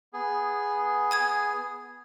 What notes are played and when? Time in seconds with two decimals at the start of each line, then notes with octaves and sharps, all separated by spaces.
0.13 B3 G#4
1.11 G#5 D#6 G#6